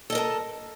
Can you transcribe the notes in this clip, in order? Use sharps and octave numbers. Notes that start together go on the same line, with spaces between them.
A4 A#4 D#5 A5